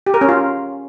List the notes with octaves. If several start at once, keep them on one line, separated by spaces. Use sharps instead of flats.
G4
A#4
C#4
F4